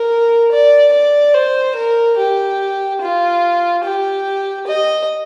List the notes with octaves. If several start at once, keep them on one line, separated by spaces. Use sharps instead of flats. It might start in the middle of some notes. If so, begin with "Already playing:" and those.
Already playing: A#4
D5
D5
C5
A#4
G4
F4
G4
D#5